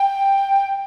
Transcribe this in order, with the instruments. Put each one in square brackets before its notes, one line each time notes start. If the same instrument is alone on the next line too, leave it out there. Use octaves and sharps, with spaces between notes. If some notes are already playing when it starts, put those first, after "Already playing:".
Already playing: [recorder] G5